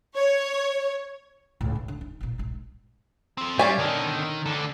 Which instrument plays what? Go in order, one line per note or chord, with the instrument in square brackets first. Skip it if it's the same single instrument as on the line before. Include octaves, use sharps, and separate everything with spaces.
[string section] C#5
[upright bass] C#2 A2
D#3
D3
D#4
A1 A#2
A#1 G#2
[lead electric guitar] C4 A4
[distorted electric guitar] G3 [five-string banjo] C#4 D5 G#5 [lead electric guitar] E5 F5
[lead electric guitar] B2 D3 [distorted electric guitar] D#3
[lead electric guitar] D2 A4 [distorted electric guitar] D3